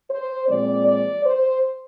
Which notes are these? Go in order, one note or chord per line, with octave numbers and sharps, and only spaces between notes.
C5
A#2 F3 G#3 C4 D5
D5
C5